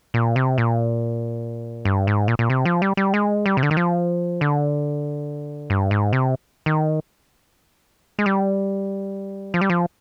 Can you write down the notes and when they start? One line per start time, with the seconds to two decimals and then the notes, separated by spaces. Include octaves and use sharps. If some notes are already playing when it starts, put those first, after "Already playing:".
0.14 A#2
0.36 C3
0.58 A#2
1.85 G2
2.07 G#2
2.28 A#2
2.39 A#2
2.50 C3
2.65 F3
2.82 G3
2.97 G3
3.14 G#3
3.46 G3
3.57 C3
3.63 D3
3.71 D#3
3.77 F3
4.41 D3
5.70 G2
5.91 G#2
6.13 C3
6.66 D#3
8.19 G#3
8.26 G3
9.54 F3
9.61 G3
9.70 F3